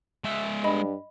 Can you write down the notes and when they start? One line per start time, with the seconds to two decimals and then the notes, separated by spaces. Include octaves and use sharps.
0.24 G#3 E5
0.64 G2 D#5 B5